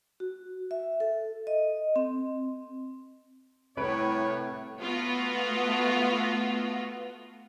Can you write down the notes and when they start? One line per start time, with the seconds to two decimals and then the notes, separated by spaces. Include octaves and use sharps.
0.20 F#4
0.71 E5
1.00 A4
1.47 D#5
1.96 C4
3.77 C2 A2 B4 C#5 D7
4.78 A3 B3 F4 F#4